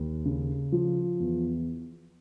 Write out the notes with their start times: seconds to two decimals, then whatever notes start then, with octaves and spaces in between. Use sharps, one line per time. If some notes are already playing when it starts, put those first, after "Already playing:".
Already playing: D#2
0.25 C#3
0.72 F3
1.20 E2